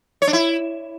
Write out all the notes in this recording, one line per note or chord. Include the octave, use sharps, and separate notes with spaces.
C#5
D4
E4